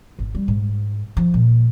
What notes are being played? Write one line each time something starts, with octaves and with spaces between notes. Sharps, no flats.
G#1
G3
G#2
F3
A#2